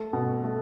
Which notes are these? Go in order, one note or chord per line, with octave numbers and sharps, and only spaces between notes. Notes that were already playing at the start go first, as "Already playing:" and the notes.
Already playing: A3
B2
A3